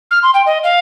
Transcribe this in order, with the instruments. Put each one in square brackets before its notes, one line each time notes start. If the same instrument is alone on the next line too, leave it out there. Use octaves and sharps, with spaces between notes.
[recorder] F6
C6
G5
D#5
F5